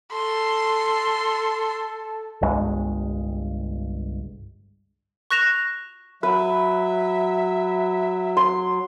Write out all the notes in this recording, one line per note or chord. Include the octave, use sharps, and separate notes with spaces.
A4 C6
G1 C2 G2 G#3
C#6 F#6 A#6 E7 F7
F#3 B4 E5
C6